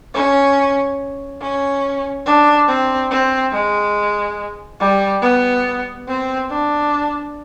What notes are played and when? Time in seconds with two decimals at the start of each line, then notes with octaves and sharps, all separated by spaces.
0.14 C#4
1.41 C#4
2.26 D4
2.68 C4
3.11 C4
3.53 G#3
4.80 G3
5.22 B3
6.07 C4
6.50 D4